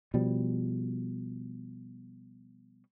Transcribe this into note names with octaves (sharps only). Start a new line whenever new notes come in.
B2 F3 G3